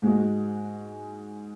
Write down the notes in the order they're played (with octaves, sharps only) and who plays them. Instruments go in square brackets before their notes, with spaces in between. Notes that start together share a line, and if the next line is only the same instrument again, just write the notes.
[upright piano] G#2 G#3 F#4